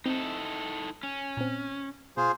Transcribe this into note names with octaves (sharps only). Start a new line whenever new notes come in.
C4 D#4 E4 A4
C#4
A#2 C4
B2 F4 G#4 C5